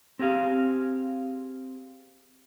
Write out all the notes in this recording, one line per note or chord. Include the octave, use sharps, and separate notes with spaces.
C4 G4 G#4 F5